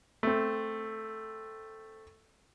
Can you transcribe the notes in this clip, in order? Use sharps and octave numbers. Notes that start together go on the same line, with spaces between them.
A3 C4